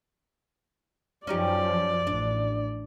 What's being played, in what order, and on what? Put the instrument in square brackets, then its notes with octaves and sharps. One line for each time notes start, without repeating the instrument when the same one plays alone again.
[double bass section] F#2 F3 [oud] C#4 D#4 G4 [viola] D5
[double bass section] A1 [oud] D4